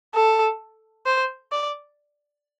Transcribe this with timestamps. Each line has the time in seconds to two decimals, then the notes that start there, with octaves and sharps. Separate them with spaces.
0.14 A4
1.06 C5
1.52 D5